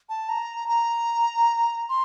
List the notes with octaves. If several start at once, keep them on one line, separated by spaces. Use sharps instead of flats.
A5
A#5
A#5
C6